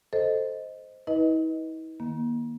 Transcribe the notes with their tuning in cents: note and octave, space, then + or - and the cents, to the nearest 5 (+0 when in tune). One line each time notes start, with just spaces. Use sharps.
A4 +0 C5 +0 D#5 +0
E4 -45 B4 -20 D#5 +15
D#3 +0 A#3 +30